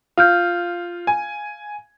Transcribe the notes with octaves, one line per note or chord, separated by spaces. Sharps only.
F4 F5 F6 G6
G#5